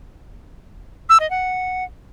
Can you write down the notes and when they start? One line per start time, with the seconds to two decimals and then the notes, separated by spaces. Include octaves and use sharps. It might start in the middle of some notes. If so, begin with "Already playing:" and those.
1.09 E6
1.20 D#5
1.30 F#5